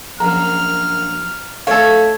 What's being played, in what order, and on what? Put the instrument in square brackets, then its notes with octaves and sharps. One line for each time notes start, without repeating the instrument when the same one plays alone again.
[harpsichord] A#1 F#2 [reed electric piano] A#5 [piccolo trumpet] F6
[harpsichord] A3 [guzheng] A4 C#5 [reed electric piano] F5